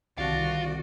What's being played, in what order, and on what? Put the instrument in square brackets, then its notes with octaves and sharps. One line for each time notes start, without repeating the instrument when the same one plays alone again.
[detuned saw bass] C2 [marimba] D3 D#3 A5 [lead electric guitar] F4 F5 [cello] F#4 D5